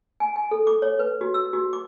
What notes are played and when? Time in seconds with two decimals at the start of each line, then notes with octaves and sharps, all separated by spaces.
0.20 G#5
0.36 G#5
0.51 A4
0.67 D6
0.82 C#5
0.99 B4
1.21 F#4
1.34 E6
1.53 F#4
1.73 D6